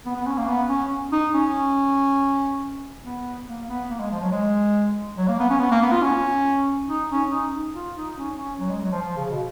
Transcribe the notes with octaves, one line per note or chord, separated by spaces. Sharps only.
B3
B3
C#4
A#3
B3
C#4
D#4
C#4
B3
A#3
B3
A#3
G#3
F3
F#3
G#3
F#3
A#3
B3
C#4
B3
A#3
B3
F4
C#4
D#4
C#4
D#4
F4
D#4
C#4
C#4
F#3
G#3
F#3
F3
F3
C#3
B2